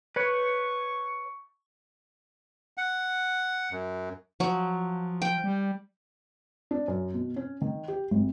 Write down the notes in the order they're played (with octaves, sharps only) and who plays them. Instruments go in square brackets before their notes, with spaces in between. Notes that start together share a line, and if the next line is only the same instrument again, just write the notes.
[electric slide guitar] B4 C#5 [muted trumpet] C#6
[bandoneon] F#5
F#2
[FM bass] F3 [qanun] F#3
[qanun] G5
[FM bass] G3
[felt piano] D4
F#2
B2
C#4
D#3
G4
G#1